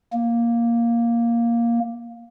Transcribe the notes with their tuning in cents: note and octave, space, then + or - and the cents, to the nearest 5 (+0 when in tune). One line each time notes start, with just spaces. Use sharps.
A#3 +5